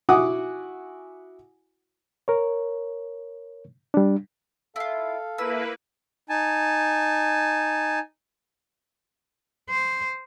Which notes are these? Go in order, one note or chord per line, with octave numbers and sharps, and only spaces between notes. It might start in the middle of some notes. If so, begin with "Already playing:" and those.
E4 F#4 F#5 G#5 D6 D#6
A#4 C#5
G3 D4
E4 F4 A4 F5
A#3 E4 B4 B5 E6
D#4 G#5 A5
C5